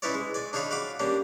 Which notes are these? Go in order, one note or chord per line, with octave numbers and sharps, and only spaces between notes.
C#4 D#4 E4 B4 C#5 D5
G#3
D5 G#5
D4 D#4 G#4 C#5 F5 B5
F#4 F5 B5 D6
G3 A#3 C#4 D4